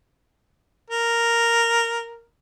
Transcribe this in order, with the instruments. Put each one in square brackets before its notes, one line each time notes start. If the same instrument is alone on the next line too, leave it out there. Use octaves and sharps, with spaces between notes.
[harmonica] A#4